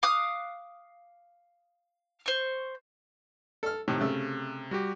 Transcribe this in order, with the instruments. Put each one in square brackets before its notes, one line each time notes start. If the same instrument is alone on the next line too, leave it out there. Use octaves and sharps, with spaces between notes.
[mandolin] F5 D6 D#6 F#6
C5 C#6
[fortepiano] A4 F6
[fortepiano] A2 D#3 [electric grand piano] C3
[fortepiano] C#3 A3 E6
[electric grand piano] G3 F#4 G4